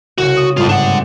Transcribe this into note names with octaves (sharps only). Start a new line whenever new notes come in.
C2 C#3 F#4
C#6 D#6
G1 G#2 F4 A4 D#6
D4 F#5
C4